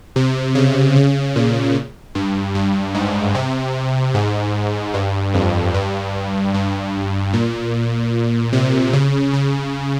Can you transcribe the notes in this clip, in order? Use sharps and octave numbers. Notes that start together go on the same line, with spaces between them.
C3
C#3
C#3
A#2
G2
G2
G#2
C3
G#2
G2
F2
G2
G2
A#2
C3
C#3
C#3